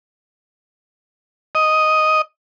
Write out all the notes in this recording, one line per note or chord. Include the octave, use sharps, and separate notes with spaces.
D#5